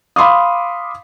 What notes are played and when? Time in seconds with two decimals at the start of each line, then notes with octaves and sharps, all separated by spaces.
0.16 F5 B5 C6 D6 D#6